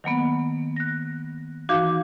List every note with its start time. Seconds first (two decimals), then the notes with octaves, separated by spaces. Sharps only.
0.04 D#3 F#3 A#3 B3
0.76 F#6 A#6
1.69 E3 D#4 F#4 F5 D6 G6